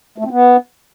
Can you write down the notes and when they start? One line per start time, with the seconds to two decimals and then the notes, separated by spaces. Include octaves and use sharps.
0.18 A3
0.24 C4
0.31 B3